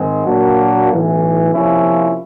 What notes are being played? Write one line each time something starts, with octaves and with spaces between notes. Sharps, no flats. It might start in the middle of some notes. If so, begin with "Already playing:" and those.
Already playing: G#2 D#3 G#3 C4
A#2 F#3 A#3 D4 F#4
B1 A2 E3
C3 F3 A#3 C#4 E4